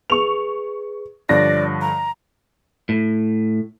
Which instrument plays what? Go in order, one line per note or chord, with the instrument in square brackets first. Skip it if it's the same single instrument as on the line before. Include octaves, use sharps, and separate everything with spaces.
[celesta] G#4 B4 [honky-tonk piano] C#6 F7
[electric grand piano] G2 D3 F3 [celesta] D4 C#5 F#6 [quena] D5 [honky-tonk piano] A#6
[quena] A#5
[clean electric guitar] A2